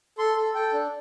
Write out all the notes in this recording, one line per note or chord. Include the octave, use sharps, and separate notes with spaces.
A4 C6
A4
A4 G5
D4